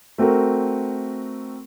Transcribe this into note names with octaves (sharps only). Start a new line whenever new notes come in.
A3 C4 F#4 A#4